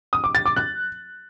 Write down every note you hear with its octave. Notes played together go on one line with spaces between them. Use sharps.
D#6
D6
A6
D6
F#6